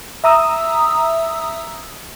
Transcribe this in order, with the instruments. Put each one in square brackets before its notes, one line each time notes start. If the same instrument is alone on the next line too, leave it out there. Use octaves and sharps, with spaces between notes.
[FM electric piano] E5 A#5 D#6 E6